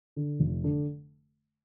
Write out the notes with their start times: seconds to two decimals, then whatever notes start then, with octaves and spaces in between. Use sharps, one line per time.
0.16 D3
0.40 F1
0.64 D3